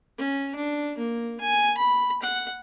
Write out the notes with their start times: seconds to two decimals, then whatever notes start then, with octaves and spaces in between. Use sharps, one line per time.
0.18 C#4
0.55 D4
0.98 A#3
1.40 G#5
1.78 B5
2.22 F#5